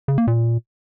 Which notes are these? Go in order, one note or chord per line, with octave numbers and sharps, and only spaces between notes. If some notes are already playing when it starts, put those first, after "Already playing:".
C#3
A#3
A#2